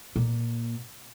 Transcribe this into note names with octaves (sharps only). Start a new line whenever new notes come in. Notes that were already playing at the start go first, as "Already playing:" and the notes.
A#2